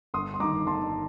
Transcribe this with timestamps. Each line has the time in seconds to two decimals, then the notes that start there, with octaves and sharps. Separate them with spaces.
0.14 G1 C6 D#6
0.34 C6
0.40 G2 D#3 A#5 D6
0.66 G1 A5 C6